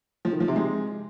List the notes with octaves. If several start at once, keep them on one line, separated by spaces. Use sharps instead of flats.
F3
D#3
F3
C3
G#3